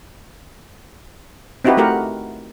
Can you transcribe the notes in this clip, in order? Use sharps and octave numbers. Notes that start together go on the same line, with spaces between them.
C4 D#4 E4 F#4 G4 B4
A3 F#4 G4 A#4 F#5